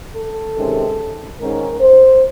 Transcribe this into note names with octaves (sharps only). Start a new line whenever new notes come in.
A4
C3 D#3 G#3 C#4
G#2 D#3 G#3 C#4 A#4
C5